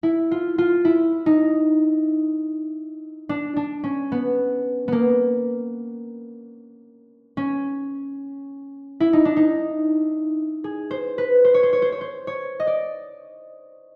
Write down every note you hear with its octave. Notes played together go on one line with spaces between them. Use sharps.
E4
F4
F4
E4
D#4
D4
D4
C#4
B3
A#3 B3
C#4
E4
D#4
D4
D#4
G#4
C5
B4
C5
C#5
C5
C#5
C5
C#5
C5
C#5
D#5
D5